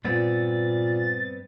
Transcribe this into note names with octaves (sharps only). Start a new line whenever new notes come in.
G2 A#2 B3 C4 A6